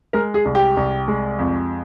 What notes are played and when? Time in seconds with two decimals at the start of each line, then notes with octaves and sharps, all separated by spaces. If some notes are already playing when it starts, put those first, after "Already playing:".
0.13 G#3 A#4
0.34 G#4
0.45 C2
0.55 G4
0.77 C2
1.08 G#3
1.39 F2